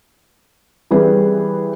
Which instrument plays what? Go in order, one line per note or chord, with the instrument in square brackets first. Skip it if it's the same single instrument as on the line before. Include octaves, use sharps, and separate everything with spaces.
[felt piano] E3 G3 C4 G#4 B4